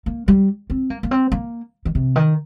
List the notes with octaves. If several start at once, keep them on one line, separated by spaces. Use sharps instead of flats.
A#3
G3
C4
A#3
A#3
C4
A#3
D#3
C3
D#3